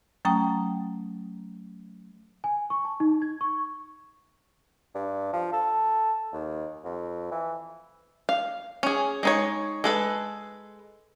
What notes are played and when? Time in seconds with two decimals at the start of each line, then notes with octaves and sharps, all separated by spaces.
0.25 F#3 A3 C#4 G5 A#5 D#6
2.44 G#5
2.70 C#6
2.85 A5
3.00 D#4
3.22 G#6
3.41 C#6
4.95 G2
5.33 F3
5.53 A4
6.33 D#2
6.85 F2
7.31 E3
8.29 F5
8.83 C#4 G#4
9.23 G#3 D#4 C#5
9.84 G#3 A4 B4